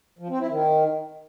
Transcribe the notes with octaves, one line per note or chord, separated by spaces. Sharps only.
F3
C4
E4
D#3